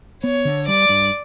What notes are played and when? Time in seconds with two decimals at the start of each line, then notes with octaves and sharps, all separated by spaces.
0.24 B3 C#5
0.45 D3
0.67 G3 D5
0.89 G2